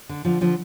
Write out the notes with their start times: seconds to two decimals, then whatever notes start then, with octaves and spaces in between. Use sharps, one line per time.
0.09 D3
0.25 D3 F3
0.41 D3 F3